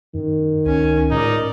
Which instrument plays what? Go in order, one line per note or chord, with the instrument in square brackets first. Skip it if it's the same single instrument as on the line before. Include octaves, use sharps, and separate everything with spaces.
[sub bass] F#2 [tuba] D#3
[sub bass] C#2 [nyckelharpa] C#4 G#5
[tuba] C#2 [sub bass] A2 [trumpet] D#4 [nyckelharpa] A#4 D5